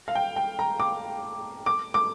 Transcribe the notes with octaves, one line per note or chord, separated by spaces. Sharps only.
F5
G5
G5
A#5
D6
D6
D6